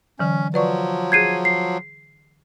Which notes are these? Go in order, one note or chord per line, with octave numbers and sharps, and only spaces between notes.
D3 E3 F#3 C#4
F3 F#3 B4 D5 C#6
G#4 G6 G#6 C7 D#7
C7